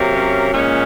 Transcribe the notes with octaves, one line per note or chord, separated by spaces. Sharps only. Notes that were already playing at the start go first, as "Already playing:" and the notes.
Already playing: C3 F#3 A#3
C#4
A#2 G#3 C#4